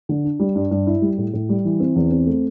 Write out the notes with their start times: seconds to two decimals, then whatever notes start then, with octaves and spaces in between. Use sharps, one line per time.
0.09 D3
0.24 D4
0.40 G3
0.56 G2
0.71 G2
0.87 E4
1.02 G3
1.18 A2
1.34 A2
1.49 G3
1.65 E3
1.80 C4
1.96 E2
2.11 C4
2.27 A3